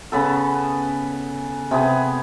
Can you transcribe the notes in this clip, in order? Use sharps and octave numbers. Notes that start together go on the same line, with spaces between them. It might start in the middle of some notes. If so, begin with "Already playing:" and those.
C#3 B3 A4
C3 B3 G#4